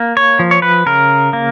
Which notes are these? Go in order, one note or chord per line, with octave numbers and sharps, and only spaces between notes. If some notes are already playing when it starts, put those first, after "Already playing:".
Already playing: A#3
C#5
F3
C#5
B4
C#3 A#4
A#3